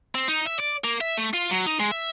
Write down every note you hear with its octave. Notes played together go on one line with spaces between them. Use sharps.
C4
D#4
E5
D5
A#3
E5
A3
F4
F#3
D#4
G#3
E5